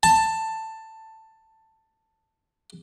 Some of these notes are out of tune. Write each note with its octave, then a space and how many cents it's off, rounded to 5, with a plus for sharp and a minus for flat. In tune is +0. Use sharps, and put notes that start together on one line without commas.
A5 +10